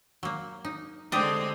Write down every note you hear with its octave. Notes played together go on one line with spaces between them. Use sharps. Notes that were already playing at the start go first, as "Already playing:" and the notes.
F#3 A#3
D#4
D3 G#3 C4 D4 G4 D5 D#6